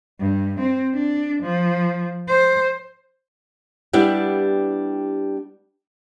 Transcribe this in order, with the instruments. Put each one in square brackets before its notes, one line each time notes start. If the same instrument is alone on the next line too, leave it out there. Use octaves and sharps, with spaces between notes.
[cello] G2
C4
D4
F3
C5
[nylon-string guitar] G3 B3 D4 E4 G4